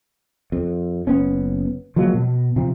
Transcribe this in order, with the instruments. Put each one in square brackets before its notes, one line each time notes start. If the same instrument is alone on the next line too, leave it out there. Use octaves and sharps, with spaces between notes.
[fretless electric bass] F2
F#1 B3 C#4
F3 F#3 G#3 A#3
B2
C3 F3